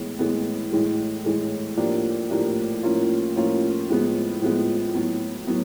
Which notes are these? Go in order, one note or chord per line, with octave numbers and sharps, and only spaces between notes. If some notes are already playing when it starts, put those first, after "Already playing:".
Already playing: A2 E3 G#3 B3
A2 E3 G#3 B3
A2 E3 G#3
A2 E3 G#3
A2 F3 A#3 D4 G4
A2 F3 A#3 D4 G4
A2 F3 A#3 C#4 F4
A2 F3 A#3 C#4 F4
A2 F3 G#3 B3
A2 F3 G#3 B3
A2 F#3 B3
A2 F#3 B3